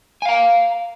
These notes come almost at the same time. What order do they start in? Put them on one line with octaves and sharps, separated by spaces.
G#5 F5 A#5